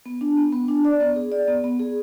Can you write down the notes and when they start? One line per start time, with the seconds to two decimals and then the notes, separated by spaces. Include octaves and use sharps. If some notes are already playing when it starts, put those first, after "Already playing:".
0.06 B3
0.21 D4
0.37 B3
0.52 B3
0.68 D4
0.85 D5
1.00 B3
1.16 G#4
1.32 D5
1.48 B3
1.64 B3
1.80 G#4